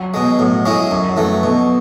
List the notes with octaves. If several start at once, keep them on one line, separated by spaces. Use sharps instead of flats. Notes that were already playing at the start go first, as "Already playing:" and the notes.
Already playing: F#3
B2 G#3
A2 F#3
G#3 C#4 E4
F#2 F#3
E3 F#3 A3
B2